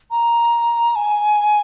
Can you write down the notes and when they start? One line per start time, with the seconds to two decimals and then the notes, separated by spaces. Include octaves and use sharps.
0.11 A#5
0.96 G#5